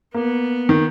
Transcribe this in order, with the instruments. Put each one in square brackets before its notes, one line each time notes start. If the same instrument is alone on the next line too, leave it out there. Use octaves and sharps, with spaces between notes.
[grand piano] A#3 [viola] B3
[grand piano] D#3